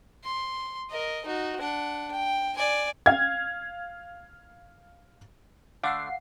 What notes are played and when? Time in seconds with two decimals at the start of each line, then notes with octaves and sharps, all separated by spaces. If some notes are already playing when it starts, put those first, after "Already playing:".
0.24 C6
0.90 A#4 D#5
1.25 D#4 F#4
1.60 D4 F#5
2.11 G5
2.57 D5 G#5
3.06 F5 G#6
5.83 D3 A3 D4 F5 F#5 C7